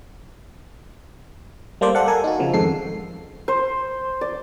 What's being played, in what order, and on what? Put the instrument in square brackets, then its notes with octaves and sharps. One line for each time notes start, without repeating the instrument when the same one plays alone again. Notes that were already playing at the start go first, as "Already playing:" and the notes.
[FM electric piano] G3 A#3 A4 C5 D5
A4 D5 F5 F#5
A4 A#4 G#5
D#4 F#4
C#3 F3
F2 G#2 D#3 A4 C7
[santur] C5
D5